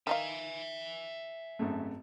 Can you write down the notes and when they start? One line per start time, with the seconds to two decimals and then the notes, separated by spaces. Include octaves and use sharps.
0.07 D#3 D#4 E5 F5 G#5
1.59 G#1 F#2 A3